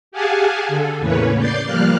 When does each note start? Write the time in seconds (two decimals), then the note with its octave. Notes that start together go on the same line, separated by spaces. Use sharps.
0.12 G4 G#4 F5 F#5 G#5 A5
0.68 D3 A4
0.99 E2 A2 C#3 A#3 B4 C#5
1.37 D5 G6 A6 C7
1.66 F3 G3 A#3 F6 F#6